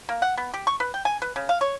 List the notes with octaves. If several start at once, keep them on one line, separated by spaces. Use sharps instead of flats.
A#3
F#5
B3
G4
C#6
B4
G5
G#5
B4
C#3
F5
C#5